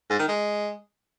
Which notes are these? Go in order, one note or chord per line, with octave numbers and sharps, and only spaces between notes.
G#2
D#3
G#3